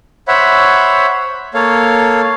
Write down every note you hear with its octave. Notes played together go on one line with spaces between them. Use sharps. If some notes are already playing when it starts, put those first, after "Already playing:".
C5 C#5 E5 F#5 B5
A#3 A4 C#5 F5